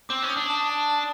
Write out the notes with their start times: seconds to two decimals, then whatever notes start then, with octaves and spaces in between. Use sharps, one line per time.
0.09 C4 D6
0.23 C#4
0.29 D#6
0.37 D4
0.50 A5
0.70 A5
0.90 A5